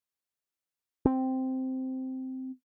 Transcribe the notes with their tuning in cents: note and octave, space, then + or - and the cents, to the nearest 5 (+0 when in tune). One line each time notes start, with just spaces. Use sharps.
C4 -5